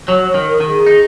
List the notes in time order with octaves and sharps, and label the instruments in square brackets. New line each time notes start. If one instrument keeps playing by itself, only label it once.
[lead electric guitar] F#3 [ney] C#5
[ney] C#5
[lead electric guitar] D#3
[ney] A#4
[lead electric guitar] D#3
[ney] G#4
[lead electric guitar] D#4